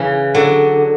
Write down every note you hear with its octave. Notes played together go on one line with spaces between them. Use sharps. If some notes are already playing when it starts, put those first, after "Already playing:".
Already playing: C#3 E3
D3 F#3